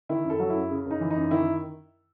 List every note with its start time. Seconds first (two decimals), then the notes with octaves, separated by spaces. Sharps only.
0.09 D#3 E4
0.24 F#2
0.30 A4
0.40 F#3
0.50 F#2 E4
0.70 C#3
0.86 F#2
0.91 D#4
1.00 E3
1.11 D#4
1.16 F#2
1.31 D#3 E4